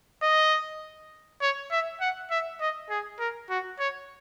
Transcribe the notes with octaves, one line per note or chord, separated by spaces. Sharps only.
D#5
C#5
E5
F#5
E5
D#5
G#4
A#4
F#4
C#5